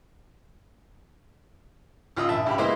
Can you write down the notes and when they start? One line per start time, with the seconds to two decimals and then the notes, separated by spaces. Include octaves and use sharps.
2.16 C#2 F4 D#5 D#6 E6
2.29 A#1 E5 A5
2.46 C#2 G4 B5
2.58 G#3 A#3 B3 E4 C5 D#5